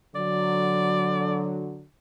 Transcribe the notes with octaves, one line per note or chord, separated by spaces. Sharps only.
D3 F#3 D5